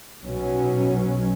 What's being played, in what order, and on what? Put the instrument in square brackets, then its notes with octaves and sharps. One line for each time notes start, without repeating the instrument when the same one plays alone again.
[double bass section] B1 B2 F#3 C#4